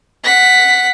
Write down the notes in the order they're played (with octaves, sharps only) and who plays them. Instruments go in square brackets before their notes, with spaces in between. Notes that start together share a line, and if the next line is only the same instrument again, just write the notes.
[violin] F#5 B6